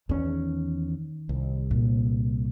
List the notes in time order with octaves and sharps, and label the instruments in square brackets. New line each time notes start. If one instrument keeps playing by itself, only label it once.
[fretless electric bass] E2 C#4 [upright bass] D#3
[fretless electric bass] C2
[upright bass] A#2